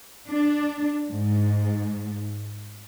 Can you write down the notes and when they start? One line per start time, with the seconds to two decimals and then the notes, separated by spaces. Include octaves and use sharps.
0.30 D4
1.12 G#2